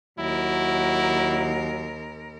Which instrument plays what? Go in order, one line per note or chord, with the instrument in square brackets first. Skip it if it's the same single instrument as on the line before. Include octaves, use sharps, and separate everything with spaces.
[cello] D#2 A#4 [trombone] F#3 [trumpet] E4